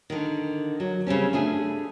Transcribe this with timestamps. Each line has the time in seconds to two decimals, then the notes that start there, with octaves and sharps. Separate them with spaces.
0.10 D3 D#3
0.80 F#3
1.07 C#3 G3 C4 C#4
1.33 A3 D4 G#4